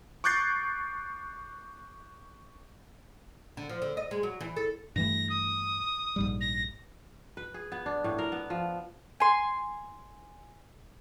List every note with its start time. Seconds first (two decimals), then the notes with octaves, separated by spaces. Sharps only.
0.24 C#6 D6 F#6 G6 A6 C7
3.57 D3
3.69 F3
3.82 D3
3.97 D#5
4.11 G#3
4.23 F#3
4.41 E3
4.56 A4
4.96 G2 E3 A3 A#6
5.30 D#6
6.16 A#1 G#2 G3
6.41 A#6
7.37 B4
7.54 G#4
7.72 B3
7.86 D4
8.04 A2
8.18 A#4
8.32 B3
8.50 F3
9.20 G#5 C6